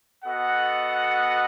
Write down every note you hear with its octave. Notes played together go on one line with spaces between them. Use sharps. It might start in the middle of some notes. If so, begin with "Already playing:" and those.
B3 F#4 A4 D#5 F#5